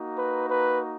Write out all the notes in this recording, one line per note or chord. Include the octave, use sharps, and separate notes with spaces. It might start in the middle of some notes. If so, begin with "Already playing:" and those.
Already playing: A#3 D#4 F#4
B4
B4